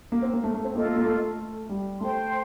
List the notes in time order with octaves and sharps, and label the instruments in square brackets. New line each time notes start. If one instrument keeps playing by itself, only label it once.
[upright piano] A#3
C4
A#3
A3
A3
C4
[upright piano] A#3 [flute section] F4 A4 D#5
[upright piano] A3
A#3
A3
G3
[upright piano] A3 [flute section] C5 G5 C6